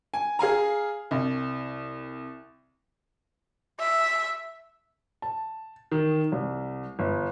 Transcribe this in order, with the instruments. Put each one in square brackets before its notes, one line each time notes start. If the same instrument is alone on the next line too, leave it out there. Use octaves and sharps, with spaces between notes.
[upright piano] G#5
G#4 F5 G#5 A#5
C2
[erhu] E5
[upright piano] A5
D#3
C2
G1